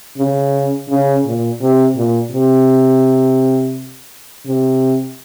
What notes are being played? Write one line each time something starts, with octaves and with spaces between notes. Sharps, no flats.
C#3
C#3
A#2
C3
A#2
C3
C3